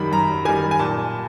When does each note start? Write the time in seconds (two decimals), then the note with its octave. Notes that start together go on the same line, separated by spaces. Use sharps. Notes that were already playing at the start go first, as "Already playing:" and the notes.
Already playing: F#2 D#3 G3 B5
0.12 F#2 A#5
0.45 D#3 G3 G#5
0.71 G#5
0.79 A#2 A5